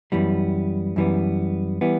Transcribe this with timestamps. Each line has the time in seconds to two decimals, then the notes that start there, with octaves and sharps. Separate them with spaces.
0.12 F#2 E3 G3 B3
0.96 F#2 E3 G3 B3
1.81 E3 G3 B3